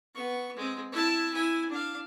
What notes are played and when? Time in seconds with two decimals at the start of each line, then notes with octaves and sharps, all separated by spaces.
0.15 B3 C#6
0.56 G#3 C4
0.92 E4 A5
1.33 E4 G#5
1.69 D4 F5